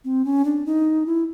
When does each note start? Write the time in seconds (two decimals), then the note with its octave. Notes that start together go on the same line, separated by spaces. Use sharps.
0.05 C4
0.25 C#4
0.45 D4
0.66 D#4
1.06 E4